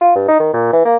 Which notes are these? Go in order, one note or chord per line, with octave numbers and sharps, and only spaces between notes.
F4
G2
D#4
D#3
A#2
E3
A#3